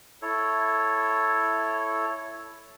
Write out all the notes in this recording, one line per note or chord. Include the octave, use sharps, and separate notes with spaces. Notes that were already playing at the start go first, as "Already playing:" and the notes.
E4 A4 C#5